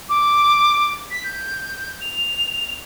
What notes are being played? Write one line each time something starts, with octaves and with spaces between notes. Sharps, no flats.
D6
B6
G6
F7